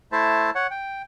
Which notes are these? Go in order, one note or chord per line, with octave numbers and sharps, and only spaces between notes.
A3 E4 C5 E5 A5
C#5 F#5
G5